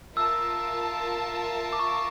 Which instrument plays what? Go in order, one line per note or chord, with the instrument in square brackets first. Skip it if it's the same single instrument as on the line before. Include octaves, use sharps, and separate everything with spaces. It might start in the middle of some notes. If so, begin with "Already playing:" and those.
[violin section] F4 A#4 E5 A5 [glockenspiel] E6
[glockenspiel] D6
C#6